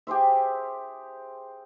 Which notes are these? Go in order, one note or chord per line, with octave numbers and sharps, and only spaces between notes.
G4 G#4 C5 E5